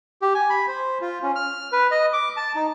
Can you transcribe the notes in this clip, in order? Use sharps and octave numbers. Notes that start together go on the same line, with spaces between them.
G4
G#5
B5
C5
F4
C#4
F6
B4
D#5
D6
A5
D#4